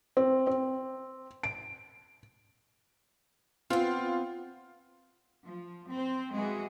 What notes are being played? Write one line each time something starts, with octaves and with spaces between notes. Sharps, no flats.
C4
C4
D7
B3 C4 F4
F3
C4 C5
E3 G#3 F#4 G#4